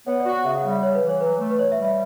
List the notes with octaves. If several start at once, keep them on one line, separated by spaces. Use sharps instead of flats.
B3 C#5
D5
F#4
F#5
C#3 E5
F#5
G3
E5
C#3 C#5
B4
E3
C#5
F#3 B4
A3
B4
B2 C#5
E5
G3
E5